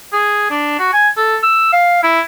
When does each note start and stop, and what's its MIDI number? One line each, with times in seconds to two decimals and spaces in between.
0.13 0.49 68
0.51 0.79 62
0.79 0.93 66
0.93 1.09 80
1.17 1.38 69
1.43 1.70 88
1.73 1.98 77
2.03 2.21 64